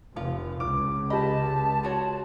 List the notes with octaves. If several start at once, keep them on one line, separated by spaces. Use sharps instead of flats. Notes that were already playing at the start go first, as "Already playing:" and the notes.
F1 F3 F4
C#2 D6
G4 D#5 A5 B5
F4 F#4 C#5